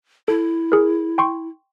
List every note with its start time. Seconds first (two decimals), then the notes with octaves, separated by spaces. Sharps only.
0.28 E4 A4
0.72 G#4 A#4
1.18 G5 C6 C#6